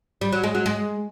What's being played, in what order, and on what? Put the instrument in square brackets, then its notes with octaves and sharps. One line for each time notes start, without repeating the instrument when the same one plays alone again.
[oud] G3
F#3
G#3
F#3
G#3